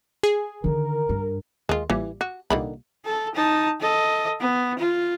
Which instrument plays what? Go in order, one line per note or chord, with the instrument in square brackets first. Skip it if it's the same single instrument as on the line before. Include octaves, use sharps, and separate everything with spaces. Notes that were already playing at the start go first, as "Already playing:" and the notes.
[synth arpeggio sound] G#4 G#5
[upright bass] D3 D#3 [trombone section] A#4
[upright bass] G2
[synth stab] D#2 [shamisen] G#3 F4
[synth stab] A1 A#2 G3 [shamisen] E3
[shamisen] F#4
[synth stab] C2 A#2 [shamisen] D3 D#3 B5
[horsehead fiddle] A4
D#4 A5
A4 D#5
B3
F4